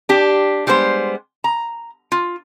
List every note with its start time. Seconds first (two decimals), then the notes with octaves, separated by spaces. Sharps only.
0.09 D4 G4
0.67 G3 G#3 B3 C5
1.44 A#5
2.12 F4